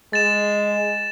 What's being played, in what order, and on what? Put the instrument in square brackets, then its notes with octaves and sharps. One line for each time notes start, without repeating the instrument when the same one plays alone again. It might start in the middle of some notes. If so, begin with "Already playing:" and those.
[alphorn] G#3 [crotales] A6 E7